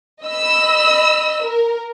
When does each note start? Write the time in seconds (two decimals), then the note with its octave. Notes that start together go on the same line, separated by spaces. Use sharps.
0.23 D#5 B5 E6
1.43 A#4